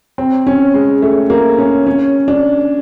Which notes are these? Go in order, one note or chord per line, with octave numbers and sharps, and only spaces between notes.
C4
C#4
G#3
A3
A#3
C#4
C#4
D4